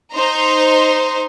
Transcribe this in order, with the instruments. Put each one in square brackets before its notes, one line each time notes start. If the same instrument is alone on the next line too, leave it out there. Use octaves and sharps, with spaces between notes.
[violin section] D#4 C5 A#5 C6